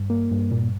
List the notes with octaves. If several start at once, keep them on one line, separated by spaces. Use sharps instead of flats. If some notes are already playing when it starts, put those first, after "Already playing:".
Already playing: G2
A#3
G2
A#2